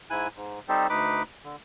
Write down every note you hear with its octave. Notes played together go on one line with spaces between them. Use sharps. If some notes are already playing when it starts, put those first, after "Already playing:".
G#2 E4 G#5 F#6
G#2
G3 C4 D#4 G4 A4 C5
D2 D#4 B4 B5 D6
D3